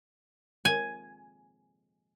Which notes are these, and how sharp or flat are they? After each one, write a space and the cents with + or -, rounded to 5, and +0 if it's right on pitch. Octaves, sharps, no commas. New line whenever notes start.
G#5 +5